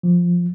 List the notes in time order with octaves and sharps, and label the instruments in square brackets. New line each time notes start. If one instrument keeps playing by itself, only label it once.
[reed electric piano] F3